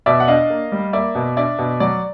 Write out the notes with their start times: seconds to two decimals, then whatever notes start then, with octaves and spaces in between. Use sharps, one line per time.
0.06 B2 D5 E5
0.20 F#5
0.28 D4 D#5 F5
0.50 A#3
0.72 G3
0.93 A#3 D5 E5
1.15 B2
1.37 D4 D5 E5
1.59 B2
1.80 F#3 D5